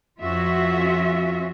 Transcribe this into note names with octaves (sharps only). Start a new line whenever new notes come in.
F2 C#4 F4 F#4 E5